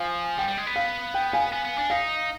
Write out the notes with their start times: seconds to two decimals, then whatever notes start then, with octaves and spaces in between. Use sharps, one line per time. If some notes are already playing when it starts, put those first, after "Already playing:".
Already playing: F3 F5 G#5
0.38 G3 G5
0.48 G3
0.57 G#3
0.67 B3
0.76 F5
1.14 G5
1.33 F5 G#5
1.53 B3
1.65 B3
1.78 D4
1.90 D#4 F5